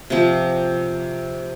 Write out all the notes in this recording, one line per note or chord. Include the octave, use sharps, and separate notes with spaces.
C3 F3 C4